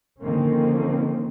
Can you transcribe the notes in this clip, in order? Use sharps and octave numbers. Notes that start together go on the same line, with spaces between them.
D3 D#3 F3 A#3 C4 C#4